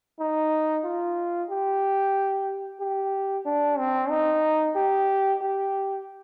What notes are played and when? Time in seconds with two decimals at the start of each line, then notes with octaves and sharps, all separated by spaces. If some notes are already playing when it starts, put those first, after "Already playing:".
0.19 D#4
0.85 F4
1.50 G4
2.80 G4
3.45 D4
3.78 C4
4.10 D#4
4.76 G4
5.41 G4